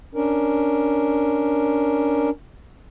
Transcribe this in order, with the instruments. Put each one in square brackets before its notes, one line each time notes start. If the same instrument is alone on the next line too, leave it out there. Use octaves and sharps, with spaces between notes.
[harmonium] C#4 D4 A#4